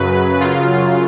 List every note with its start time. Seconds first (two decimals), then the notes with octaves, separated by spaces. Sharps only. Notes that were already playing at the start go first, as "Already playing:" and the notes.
Already playing: F#2 C#3 F#3 B4
0.40 F#2 C#3 F#3 F4